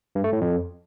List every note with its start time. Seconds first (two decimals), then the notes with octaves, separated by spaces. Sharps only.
0.15 G2
0.24 A3
0.33 A2
0.41 F2